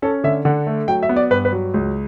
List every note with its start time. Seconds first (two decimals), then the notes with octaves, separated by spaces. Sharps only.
0.02 C#4 A4
0.24 D3 E5
0.45 D3 F#5
0.67 A3
0.88 F#3 G5
1.03 E5
1.09 B3
1.16 D5
1.31 G2 B4
1.45 B4
1.52 F#3
1.74 C#2